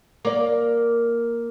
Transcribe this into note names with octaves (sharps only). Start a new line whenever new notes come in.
A#3 D5